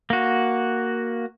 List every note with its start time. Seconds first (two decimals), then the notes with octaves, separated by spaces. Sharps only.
0.10 A#3 F#4